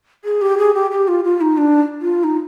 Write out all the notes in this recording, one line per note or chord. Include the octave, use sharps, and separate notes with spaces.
G#4
G4
G#4
G4
G4
F4
F4
D#4
D4
F4
D#4